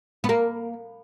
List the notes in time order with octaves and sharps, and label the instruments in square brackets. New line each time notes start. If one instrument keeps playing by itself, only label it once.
[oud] B3
A#3